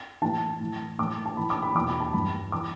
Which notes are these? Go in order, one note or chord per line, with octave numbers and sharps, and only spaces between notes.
A2 E3 A5
A2 E3
A2 E3 D6
A5
A2 E3 B5
D6
B5
E2 B2 D6
B5
A5
G2 E3 B5
E3 D6